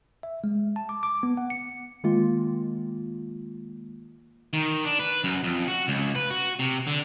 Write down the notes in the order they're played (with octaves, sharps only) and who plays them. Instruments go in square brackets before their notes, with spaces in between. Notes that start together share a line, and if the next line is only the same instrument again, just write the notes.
[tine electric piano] E5
G#3
A5
D6
D6
B3
F#5
C#7
[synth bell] D#3 G#3 A#3 F4
[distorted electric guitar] D#3
D4
B4
F#2
F2
F#4
C#2
B4
F#4
C3
D3